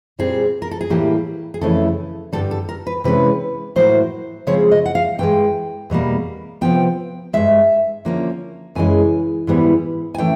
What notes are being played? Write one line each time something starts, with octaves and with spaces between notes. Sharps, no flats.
A#2 G3 C4 G#4
A#4
A4
G#4
A2 E3 G3 A#3 G4
G#4
F2 C#3 E3 A3 C#4 A4
G2 D3 G3 A4
A4
A#4
B4
C3 E3 G#3 C#4 B4
A2 F#3 A#3 C5
C#3 F3 G#3 C4 C#5
D#5
F#5
F5
G2 E3 G#3 G5
E2 B2 G3 A#3
C3 F3 G#3 B3 G5
G2 E3 G#3 E5
D3 F3 A#3 C#4
F#2 C#3 E3 G#3 C#4 G#5
G#2 E3 G3 B3
G#5
A2 E3 A3 C#4 G5